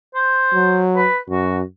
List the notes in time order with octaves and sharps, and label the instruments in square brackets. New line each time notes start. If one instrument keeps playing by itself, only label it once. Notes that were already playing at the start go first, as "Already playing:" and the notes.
[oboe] C5
[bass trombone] F#3
[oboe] B4
[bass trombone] F#2 [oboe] F#4